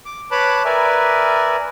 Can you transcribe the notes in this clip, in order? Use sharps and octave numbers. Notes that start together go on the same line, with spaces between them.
D6
B4 C#5 A5 B5 D6 F#6
A#4 B4 D5 E5 G#5